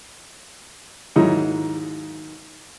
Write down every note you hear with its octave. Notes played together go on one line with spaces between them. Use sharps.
D#2 G#2 F#3 D#4 E4